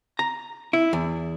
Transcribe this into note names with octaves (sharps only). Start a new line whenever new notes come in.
A#5
E4
E2